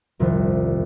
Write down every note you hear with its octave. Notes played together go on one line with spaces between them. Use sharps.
D#1 C2 F2